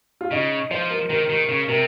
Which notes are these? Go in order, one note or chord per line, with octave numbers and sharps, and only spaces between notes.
F4
C#3 D#4
F3 C5
A#4
D#3 A#4
D#3 A#4
C#3
C3 A#4